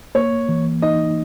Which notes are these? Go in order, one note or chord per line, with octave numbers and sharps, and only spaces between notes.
A#3 C#5
E3
D#4 D#5